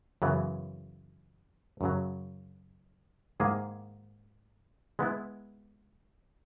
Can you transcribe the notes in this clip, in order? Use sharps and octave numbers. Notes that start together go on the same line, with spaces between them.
F#2 C#3 E3 B3 E4
F#2 C#3 F#3
G#2 D#3 A#3 E4 G#4
G#3 B3 E4